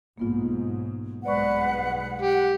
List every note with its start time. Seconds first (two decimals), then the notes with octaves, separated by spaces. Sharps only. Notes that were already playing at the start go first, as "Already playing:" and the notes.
0.18 B1 G#2 A#3 B3 F4
1.24 B1 G2 G#3 B4 C5 D5 F#5 C#6
2.22 G4 F#5